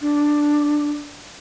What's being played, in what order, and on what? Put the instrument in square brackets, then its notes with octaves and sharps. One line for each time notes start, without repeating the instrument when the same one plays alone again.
[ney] D4